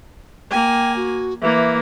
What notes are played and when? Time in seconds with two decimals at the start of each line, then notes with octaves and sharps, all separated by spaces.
0.51 A#3 G5 G#5
0.96 F#4
1.41 E3 A#3 E5